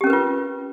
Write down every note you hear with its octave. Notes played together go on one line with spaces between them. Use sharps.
C#4 F4 G4 A#4 B4